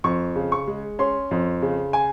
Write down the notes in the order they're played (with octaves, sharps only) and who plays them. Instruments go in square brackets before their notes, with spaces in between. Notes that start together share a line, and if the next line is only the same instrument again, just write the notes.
[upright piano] F2 C#6
C#3
C#6
G#3
C#4 C6
F2
C#3
G#5